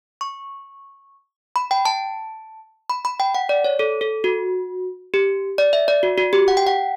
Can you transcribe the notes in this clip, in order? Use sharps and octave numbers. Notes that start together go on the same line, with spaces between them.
C#6
B5
G5
A5
B5
B5
G5
F#5
D5
C#5
A4
A4
F#4
G4
D5
E5
D5
F#4
F#4
G4
F#5
G5
F#5